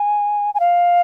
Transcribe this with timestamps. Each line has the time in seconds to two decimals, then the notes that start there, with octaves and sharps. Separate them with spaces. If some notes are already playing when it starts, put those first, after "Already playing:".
Already playing: G#5
0.54 G#5
0.60 F5